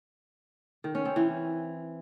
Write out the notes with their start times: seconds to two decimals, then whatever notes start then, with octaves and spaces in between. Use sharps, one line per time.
0.84 D#3
0.95 C#4
1.05 C4
1.16 E3